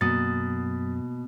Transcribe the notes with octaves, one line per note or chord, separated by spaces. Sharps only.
F#2 B2 A#3 D#6 A6